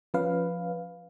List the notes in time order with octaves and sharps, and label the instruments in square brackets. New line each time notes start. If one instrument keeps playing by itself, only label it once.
[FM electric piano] F3 C#4 B4 F5